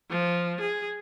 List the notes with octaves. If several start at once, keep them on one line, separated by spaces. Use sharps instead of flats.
F3
G#4